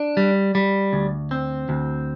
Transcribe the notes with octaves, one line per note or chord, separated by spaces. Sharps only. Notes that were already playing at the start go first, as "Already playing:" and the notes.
Already playing: D4
G3
G3
D2
C4
D2